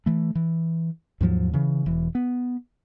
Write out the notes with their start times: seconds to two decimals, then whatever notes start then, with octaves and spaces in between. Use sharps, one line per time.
0.06 E3 A3
0.35 E3
1.21 D#2 G#2 F3 F#3
1.53 C#3 E3
1.86 E1 E3
2.15 B3